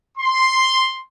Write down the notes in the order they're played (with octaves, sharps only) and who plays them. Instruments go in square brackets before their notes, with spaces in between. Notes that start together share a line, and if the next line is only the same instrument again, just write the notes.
[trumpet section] C6